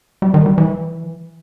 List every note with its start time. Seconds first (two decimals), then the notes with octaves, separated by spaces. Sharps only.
0.22 G3
0.34 D#3
0.46 G3
0.58 E3